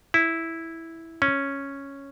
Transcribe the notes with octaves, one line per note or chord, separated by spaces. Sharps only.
E4
C#4